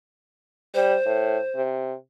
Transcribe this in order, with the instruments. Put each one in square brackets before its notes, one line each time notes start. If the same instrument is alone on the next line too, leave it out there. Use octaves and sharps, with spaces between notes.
[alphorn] G3 [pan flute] C5
[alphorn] A2
C3